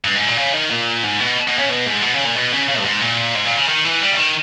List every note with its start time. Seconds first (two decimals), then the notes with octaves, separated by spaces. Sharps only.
0.04 G2
0.16 G#2
0.27 A#2
0.38 C#3
0.54 D#3
0.71 A#2
1.04 G#2
1.20 B2
1.48 B2
1.58 C#3
1.69 B2
1.86 G#2
2.02 B2
2.14 C#3
2.25 A#2
2.36 B2
2.52 C#3
2.68 C#3
2.79 G2
2.85 G#2
3.01 A#2
3.35 G#2
3.45 A#2
3.57 C#3
3.68 D#3
3.85 E3
4.01 G3
4.12 C#3
4.17 D#3